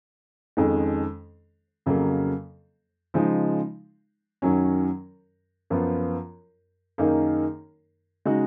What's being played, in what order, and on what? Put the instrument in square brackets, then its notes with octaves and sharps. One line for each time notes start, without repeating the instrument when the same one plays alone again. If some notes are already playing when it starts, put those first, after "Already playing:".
[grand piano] F2 D#3 G#3 C#4
F2 C#3 F#3 A#3
C#3 F3 G#3 D#4
F#2 D#3 F#3 C#4
F#2 F3 B3 F4
F#2 D#3 A#3 D#4 G#4
C#3 G#3 D#4 F#4